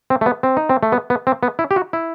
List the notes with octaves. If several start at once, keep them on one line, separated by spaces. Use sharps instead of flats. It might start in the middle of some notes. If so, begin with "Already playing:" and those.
C4
A3
B3
C4
D#4
C4
A3
B3
B3
C4
B3
E4
G4
F#4
E4